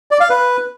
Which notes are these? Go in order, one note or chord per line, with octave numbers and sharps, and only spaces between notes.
D5
F5
B4